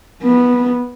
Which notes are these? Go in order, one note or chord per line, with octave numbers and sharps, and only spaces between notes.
B3